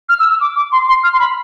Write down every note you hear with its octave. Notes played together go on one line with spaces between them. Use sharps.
F6
E6
E6
D6
D6
C6
C6
F6
C6
B5